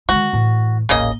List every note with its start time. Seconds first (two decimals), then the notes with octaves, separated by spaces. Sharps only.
0.09 D#3 G#3 F#4
0.33 A2 E3
0.89 D#1 A1 C#3 A#3 D#5